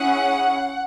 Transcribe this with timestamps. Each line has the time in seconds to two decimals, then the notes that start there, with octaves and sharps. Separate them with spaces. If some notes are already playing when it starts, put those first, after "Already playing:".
Already playing: C#4 E4 G#4 F#5